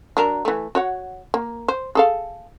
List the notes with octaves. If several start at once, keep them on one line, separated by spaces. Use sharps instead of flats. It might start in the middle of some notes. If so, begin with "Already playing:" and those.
F#3 D4 A#4
E3 A3
F#4 C#5 F#5
A#3
C5
G#4 A4 F5